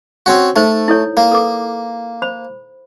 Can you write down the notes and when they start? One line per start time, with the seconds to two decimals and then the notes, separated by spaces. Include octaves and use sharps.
0.26 C4 C#4 F#4
0.56 A3 D#4 C5
0.88 E4 A4 C#5
1.17 A#3
1.32 A4 B4 D6
2.22 C5 B5